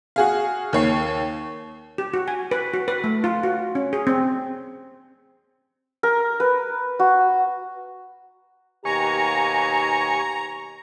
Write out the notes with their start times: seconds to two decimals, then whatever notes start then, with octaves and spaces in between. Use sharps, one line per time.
0.16 F#4 G#4 F5
0.73 D#2 C#5 C7
1.98 G4
2.14 F#4
2.28 G#5
2.51 B4
2.74 F#4
2.88 B4
3.04 A3
3.24 F4
3.43 F#4
3.75 C#4
3.93 G#4
4.07 C4
6.03 A#4
6.40 B4
6.99 F#4
8.85 D#2 B2 G4 G#5 A#5 C#6